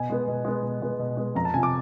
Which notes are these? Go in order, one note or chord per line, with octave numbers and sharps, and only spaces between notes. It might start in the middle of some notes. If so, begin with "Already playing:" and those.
Already playing: B2 G#5
G#3 B3
B2
G#3 B3
B2
G#3 B3
B2
G#3 B3
F2 A#5
A5
C3 F3 G#5
D6